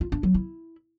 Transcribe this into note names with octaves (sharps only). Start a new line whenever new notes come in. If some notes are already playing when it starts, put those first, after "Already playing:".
F4
D4
F#3
E4